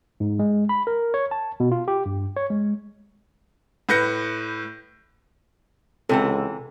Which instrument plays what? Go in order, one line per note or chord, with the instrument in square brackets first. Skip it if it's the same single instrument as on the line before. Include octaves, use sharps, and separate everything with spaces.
[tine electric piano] G#2
G#3
B5
A#4
C#5
A5
B2
F4
G4
G2
C#5
G#3
[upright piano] A2 B4 G6 A#6 C#7
[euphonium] C#2 [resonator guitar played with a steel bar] C3 E3 F#5 [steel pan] A4